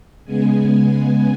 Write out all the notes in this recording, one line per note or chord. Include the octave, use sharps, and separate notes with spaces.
C#3 G#3 B3 G#5
G#5